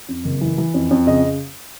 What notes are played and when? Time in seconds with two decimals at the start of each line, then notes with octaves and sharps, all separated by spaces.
0.09 F2
0.25 F#1
0.41 E3
0.58 E3
0.74 F2
0.91 F2
1.07 C#3 D#5